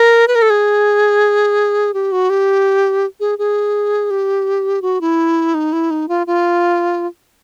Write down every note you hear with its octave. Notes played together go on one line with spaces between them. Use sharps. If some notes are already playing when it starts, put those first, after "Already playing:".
Already playing: A#4
B4
A#4
A4
G#4
G4
F#4
G4
G#4
G#4
G4
F#4
E4
D#4
E4
D#4
F4
F4